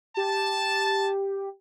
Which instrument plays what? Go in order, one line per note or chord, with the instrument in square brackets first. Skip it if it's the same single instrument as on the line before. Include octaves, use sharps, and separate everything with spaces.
[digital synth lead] G4 [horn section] A5